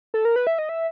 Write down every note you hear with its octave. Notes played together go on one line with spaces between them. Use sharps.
A4
A#4
B4
E5
D#5
E5